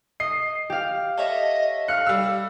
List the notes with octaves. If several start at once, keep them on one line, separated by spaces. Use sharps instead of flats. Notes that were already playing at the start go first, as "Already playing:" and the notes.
D#5 C7
G4 F5
A4 C#5 D#5 E5
F5 F6 F#6 C#7
G3 E6